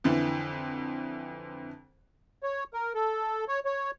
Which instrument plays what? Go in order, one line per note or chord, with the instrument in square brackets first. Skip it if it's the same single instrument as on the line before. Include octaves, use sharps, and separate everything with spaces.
[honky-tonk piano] F2 D3 E3
[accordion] C#5
A#4
A4
C#5
C#5